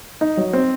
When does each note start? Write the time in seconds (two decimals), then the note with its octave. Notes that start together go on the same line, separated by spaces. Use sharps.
0.21 D#4
0.37 F#3
0.53 C4